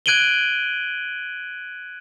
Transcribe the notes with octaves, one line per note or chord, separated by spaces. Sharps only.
F#6 G#6 D7 D#7 F#7 G7